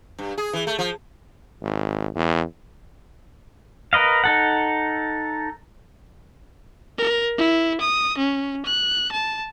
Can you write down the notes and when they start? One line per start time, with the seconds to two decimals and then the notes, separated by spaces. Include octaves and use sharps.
0.19 G2
0.38 G#4
0.53 E3
0.67 A3
0.79 F3
1.62 G#1
2.15 E2
3.93 A#4 B4 D#5 F5
4.24 D#4 A4 F#5
6.98 A#4
7.38 E4
7.80 D#6
8.18 C#4
8.65 F#6
9.12 A5